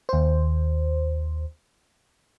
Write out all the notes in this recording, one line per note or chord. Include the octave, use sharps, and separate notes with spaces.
D#2 C5